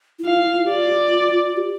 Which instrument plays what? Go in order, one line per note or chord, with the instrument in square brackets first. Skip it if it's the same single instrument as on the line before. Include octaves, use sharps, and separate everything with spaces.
[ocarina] E4
[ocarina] F4 [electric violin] F5
[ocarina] E4
F4
[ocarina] G4 [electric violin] D5
[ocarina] F4
G4